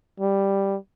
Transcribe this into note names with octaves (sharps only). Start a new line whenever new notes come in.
G3